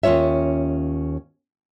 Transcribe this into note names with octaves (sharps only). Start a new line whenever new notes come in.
D#2 C#4 F4 C#5 E5